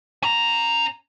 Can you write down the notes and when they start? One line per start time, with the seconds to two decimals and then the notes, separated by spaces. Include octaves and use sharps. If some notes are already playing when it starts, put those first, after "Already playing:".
0.23 C#4 A#5